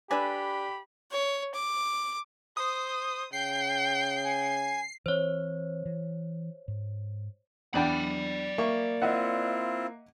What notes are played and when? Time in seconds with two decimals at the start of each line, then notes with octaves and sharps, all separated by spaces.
0.11 D4 G4 A4 B4 D5 G#5 B5
1.12 C#5
1.55 D6
2.57 C5 D#6
3.33 C#3 G5 C7
4.24 G#5
5.06 E3 C4 C5 C#5
5.86 E3
6.68 G#2
7.74 E2 D4 D5 G5 B5
8.58 A#3 E5 C#6
9.02 C4 E4 F4 D#5 E5 F#5